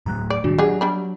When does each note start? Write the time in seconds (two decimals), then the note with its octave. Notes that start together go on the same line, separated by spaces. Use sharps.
0.06 A2 F#3 A3 A#5 F#6
0.30 D5 D7
0.44 B1 A2 D#3 G3 D4 F#4
0.58 F#3 D4 G4 G#4 F#5
0.81 G3 D4 B5